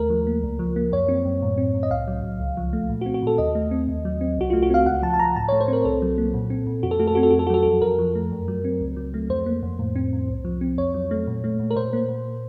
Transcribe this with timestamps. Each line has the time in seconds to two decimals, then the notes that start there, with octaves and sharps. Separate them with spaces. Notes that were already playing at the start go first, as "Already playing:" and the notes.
Already playing: D#2 A3 A#4
0.10 F3
0.27 A#3
0.43 C#2
0.59 F3
0.76 A#3
0.92 F#2 C#5
1.08 C4
1.25 F#2
1.42 A2
1.58 C4
1.74 A2
1.83 D#5
1.91 C2 F5
2.08 F#3
2.23 C2
2.40 C#2
2.57 F3
2.73 A3
2.90 A#2
3.01 F#4
3.06 C4
3.14 F#4
3.23 A#2 A4
3.38 D#2 D#5
3.55 A3
3.71 C4
3.89 D#2
4.05 F#3
4.21 C4
4.38 C2 F#4
4.50 A3 F4
4.63 F#4
4.70 C4 F5
4.86 C#2 F#5
5.02 F3 A5
5.14 A5
5.19 C#2 A#5
5.36 A2 A5
5.48 C#5
5.52 A3
5.61 C5
5.68 C4 A#4
5.85 C2 A4
6.02 F#3
6.18 A#3
6.34 A#2
6.50 C4
6.67 A#2
6.83 F2 F#4
6.91 A4
6.99 A3 F#4
7.07 A4
7.15 C4 F#4
7.23 A4
7.31 F2 F#4
7.39 A4
7.47 F#4
7.50 F#3 A4
7.63 F2 F#4
7.82 F2 A#4
7.99 F3
8.15 A3
8.32 F#2
8.48 F#3
8.64 C4
8.81 C#2
8.96 F#3
9.14 A3
9.29 F2 C5
9.46 A#3
9.63 F2
9.79 A2
9.96 C4
10.13 A2
10.28 C2
10.45 F3
10.61 C4
10.77 F2 C#5
10.94 F#3
11.11 A3
11.27 A#2
11.44 A3
11.60 A#2
11.71 A#4
11.76 A#2 C5
11.93 A#3
12.09 A#2